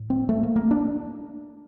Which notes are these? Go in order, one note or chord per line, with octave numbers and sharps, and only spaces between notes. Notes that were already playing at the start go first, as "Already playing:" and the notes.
Already playing: A2
C4
A3
A#3
A#3
D4